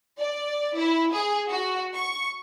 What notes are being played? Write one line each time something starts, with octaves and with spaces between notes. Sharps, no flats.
D5
E4
G#4
F#4
C#6